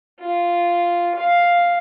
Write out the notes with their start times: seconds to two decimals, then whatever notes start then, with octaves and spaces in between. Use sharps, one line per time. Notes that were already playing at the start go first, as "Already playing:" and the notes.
0.20 F4
1.16 F5